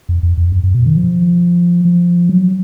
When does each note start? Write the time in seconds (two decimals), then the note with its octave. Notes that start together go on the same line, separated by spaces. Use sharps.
0.09 F2
0.23 F2
0.37 F2
0.52 F#2
0.63 F#2
0.74 B2
0.86 D#3
0.96 F3
1.85 F3
2.29 F#3